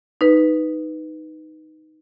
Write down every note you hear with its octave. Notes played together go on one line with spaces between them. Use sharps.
D#4 B4